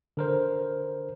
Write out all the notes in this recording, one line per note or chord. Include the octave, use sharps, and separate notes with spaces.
D3 A#4 C5